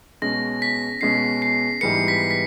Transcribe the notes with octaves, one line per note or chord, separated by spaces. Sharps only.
B2 G#3 C#4 A#6
B6
B2 G#3 C#4 C7
C7
G#2 E3 G3 B3 C#7
B6
B6